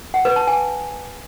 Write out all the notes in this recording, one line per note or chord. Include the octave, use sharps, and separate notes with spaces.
F#5
B4
A5
G#5